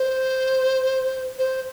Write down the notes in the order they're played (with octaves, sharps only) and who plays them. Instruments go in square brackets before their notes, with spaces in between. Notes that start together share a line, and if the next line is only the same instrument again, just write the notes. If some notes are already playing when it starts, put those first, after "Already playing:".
Already playing: [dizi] C5
C5